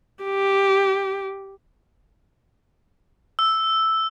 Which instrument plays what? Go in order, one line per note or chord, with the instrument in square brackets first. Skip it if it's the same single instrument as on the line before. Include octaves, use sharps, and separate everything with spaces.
[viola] G4
[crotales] E6